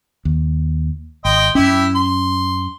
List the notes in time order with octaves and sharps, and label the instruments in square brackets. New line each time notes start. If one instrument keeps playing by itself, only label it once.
[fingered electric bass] D#2
[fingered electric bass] G#1 [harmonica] D#5 G5 C6
[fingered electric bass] F#2 C#4 [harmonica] E4 G4
[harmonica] C6